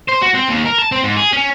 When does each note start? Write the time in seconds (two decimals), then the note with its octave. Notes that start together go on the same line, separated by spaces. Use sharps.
0.08 C5
0.22 F#4
0.34 C4
0.48 D#2
0.65 A#4
0.78 A5
0.92 C4
1.04 G#2
1.16 G#4
1.33 C#4